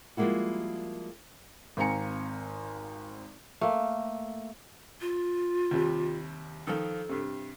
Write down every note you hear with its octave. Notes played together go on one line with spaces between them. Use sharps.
F3 G3 G#3 A#3 E4 F#4
G#1 C4 F5 G#5 A#5 C#7
A3 A#3
F4
D#2 C3 G3
D#3 F3 A4
G2 C3